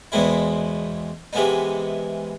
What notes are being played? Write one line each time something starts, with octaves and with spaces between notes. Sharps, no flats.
E2 B2 G#3 C4 E4
C3 E3 G#3 B3 D#4